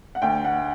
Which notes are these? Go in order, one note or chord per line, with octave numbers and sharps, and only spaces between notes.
F#5
D2 G5
F#5